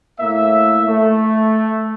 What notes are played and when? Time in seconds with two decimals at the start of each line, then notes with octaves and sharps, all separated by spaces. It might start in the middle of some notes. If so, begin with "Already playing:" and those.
0.20 A2 A#3 E5
0.88 A3